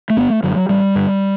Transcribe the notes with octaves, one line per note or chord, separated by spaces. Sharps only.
A3
G1 B3
A3
F#2 D3 F#3
F#3
A1 G3
G2 D3